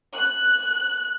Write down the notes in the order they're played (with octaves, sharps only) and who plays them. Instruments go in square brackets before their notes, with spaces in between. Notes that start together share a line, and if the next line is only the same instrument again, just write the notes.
[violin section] F#6